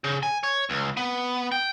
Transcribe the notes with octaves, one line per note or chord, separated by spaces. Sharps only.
C#3
G#5
C#5
C#2
B3
G5